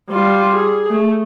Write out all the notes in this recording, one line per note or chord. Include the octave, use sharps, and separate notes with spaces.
G3 F4
G#4
A3